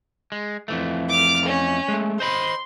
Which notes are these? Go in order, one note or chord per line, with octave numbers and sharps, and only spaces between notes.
G#3
F2 E3 A3
D6 F6
C#4
G#3 A3
C5 D#5 B5 C6